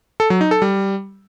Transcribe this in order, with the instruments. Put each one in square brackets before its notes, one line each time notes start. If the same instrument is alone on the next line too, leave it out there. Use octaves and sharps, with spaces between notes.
[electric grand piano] A4
F#3
D#4
A4
G3